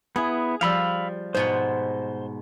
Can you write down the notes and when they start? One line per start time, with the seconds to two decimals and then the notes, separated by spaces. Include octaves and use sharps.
0.16 B3 E4 G#4
0.61 F3 G3 F5 B5 E6
1.35 G#2 B2 C5 F#5